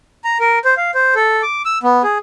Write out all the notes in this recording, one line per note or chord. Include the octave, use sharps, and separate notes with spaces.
A#5
A#4
C5
F5
C5
A4
D6
E6
B3
G#4